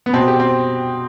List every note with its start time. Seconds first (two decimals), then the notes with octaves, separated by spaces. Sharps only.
0.06 B3
0.13 B2 C4
0.28 G4
0.40 C4